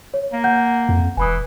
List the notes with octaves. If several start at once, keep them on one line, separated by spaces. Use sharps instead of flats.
C#5
A#3
F#5 G6
F2
E1 E3 G#5 B5 D#6